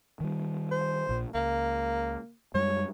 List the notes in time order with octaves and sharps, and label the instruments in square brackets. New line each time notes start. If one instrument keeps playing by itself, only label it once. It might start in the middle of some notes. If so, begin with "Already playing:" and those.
[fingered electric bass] D#3 G3
[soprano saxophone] C5
[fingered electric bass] A#1 A#2
[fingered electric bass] C#2 [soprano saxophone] A#3
[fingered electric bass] F#2 G3 G#3 [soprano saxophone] C#5